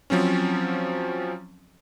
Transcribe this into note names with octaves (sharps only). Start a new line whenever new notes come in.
F3 F#3 C4 C#4